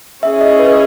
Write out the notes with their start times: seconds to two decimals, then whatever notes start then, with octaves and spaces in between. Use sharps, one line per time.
0.22 C#4 E4 G#4 E5
0.41 D#5
0.59 B4